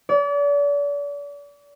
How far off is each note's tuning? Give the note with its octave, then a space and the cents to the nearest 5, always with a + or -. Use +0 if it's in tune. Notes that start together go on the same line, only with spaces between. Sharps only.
D5 -40